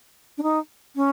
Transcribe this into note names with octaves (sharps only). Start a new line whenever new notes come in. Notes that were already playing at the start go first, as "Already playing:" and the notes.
D4
D#4
C#4